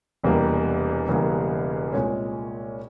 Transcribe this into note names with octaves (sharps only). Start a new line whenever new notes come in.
E1 E2 C3 G3 A#3
E1 E2 C#3 G3 A#3
C2 A#2 G#3 C#4